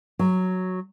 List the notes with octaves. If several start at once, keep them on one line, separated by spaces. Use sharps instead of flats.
F#3